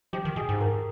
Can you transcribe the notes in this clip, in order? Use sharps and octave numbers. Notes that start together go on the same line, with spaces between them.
F3 G4
D#3
B2 G#4
G#2
A#4